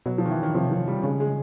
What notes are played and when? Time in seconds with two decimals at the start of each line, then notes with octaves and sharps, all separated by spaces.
0.06 B2 F#3
0.18 F3
0.25 D#3
0.31 E3
0.43 D#3
0.54 C3 F3
0.71 F3
0.88 G3
1.04 C#3 G#3
1.20 G#3